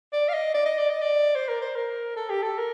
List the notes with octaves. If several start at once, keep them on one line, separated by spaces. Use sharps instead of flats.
D5
F5
D#5
D5
D#5
D5
D#5
D5
C5
A#4
C5
A#4
A4
G4
A4
A#4